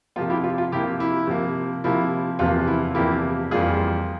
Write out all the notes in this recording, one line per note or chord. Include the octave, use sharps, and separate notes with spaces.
C3 F3 A#3 F4
E4 G4
F4
F4
C3 F3 A#3 E4 G4
E4
C3 F3 A#3
C3 F3 A#3 E4
E2 C3 F3 A#3 F4
E4
E2 C3 F3 A#3 E4 G4
F2 E3 G3 A#3 F4 G#4